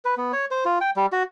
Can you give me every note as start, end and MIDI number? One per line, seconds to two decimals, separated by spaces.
0.05 0.15 71
0.17 0.32 59
0.33 0.45 73
0.51 0.64 72
0.65 0.79 65
0.81 0.91 79
0.96 1.06 55
1.12 1.23 66